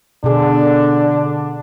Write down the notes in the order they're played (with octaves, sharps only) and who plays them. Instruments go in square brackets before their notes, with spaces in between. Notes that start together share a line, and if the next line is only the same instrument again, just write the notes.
[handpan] B2 G#4 [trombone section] D3 D4